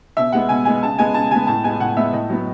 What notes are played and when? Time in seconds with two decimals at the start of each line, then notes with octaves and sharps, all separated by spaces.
0.17 B2 E5
0.32 G#3 B3 F#5
0.49 B2 G#5
0.65 G#3 B3 G#5
0.83 C#3 A5
0.98 G#3 B3 G#5
1.14 C#3 A5
1.31 G#3 B3 G#5
1.47 A2 A5
1.64 G#3 B3 G#5
1.80 A2 F#5
1.97 G#3 B3 E5
2.13 A2 D#5
2.29 F#3 B3